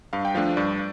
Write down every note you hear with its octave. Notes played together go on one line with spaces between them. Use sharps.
G2 F5
G5
F3 A3 D4 F5
G2 D5